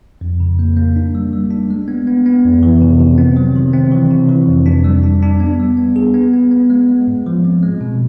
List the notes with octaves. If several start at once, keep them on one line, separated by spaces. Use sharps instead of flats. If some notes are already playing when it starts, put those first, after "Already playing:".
F2
C#3
A#3
A#3
D4
G3
G3
D4
G#3
B3
B3
B3
F2
E3
C3
C3
C4
F#3
D#3
C4
E3
C3
E3
F2
D4
G3
D4
D4
B3
G3
B3
G#4
B3
B3
B3
G#3
G#3
G#2
F3
C4
G#3
B2